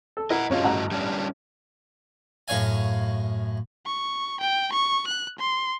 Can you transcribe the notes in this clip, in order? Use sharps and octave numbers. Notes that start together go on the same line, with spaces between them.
A4
E4 A#4 D#5 F#5
G2 C#4 F4 F#4 D#5
A1 F#5 A#5
G3 C#4 D4
F#2 A2 C#5 F5 G#5
C#6
G5
C#6
F#6
C6